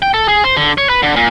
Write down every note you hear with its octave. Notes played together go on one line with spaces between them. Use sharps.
G5
A4
G#4
C5
D3
C#5
B4
D3
A#2